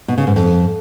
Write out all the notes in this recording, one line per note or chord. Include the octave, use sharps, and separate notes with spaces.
B2
C#3
G#2
F2